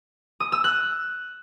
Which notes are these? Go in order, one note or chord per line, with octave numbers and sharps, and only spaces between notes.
D#6
E6
F#6